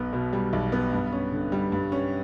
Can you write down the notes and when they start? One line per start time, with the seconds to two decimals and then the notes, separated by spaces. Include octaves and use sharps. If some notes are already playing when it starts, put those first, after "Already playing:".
Already playing: B1 B3
0.13 B2
0.33 G3
0.53 B1
0.72 B3
0.93 G2
1.12 C#4
1.32 D3
1.52 G3
1.72 G2
1.92 C#4